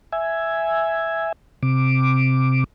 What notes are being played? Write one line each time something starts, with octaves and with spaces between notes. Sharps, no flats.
E5 G#5
C3 D6